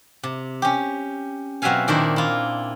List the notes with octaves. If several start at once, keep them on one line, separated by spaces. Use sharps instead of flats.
C3
C#4 G4
B2 F#3 C4 E5 F5 G#5
A#2 D#3 D4 E4 C5
E4 F4